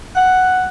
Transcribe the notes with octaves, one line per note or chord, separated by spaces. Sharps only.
F#5